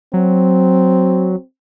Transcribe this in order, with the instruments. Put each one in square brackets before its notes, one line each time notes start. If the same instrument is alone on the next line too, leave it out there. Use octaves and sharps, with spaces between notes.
[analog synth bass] F#3 [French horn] C4